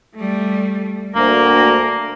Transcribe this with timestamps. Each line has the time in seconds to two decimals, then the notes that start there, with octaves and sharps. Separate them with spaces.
0.15 G3 A3
1.15 D2 A#3 A#4